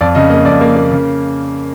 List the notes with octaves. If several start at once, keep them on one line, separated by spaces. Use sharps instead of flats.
F2 D5
C#3 D#5
A#3 D#5
F2 D5
A#3
A#3
C#3